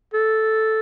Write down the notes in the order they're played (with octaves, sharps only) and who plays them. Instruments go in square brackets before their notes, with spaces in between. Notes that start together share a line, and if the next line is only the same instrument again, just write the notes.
[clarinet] A4